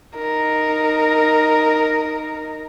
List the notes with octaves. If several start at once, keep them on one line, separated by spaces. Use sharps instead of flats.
D#4 A#4